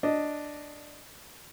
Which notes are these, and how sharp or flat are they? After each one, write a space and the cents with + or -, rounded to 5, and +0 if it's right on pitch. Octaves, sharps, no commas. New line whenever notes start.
D4 +0 D#5 +0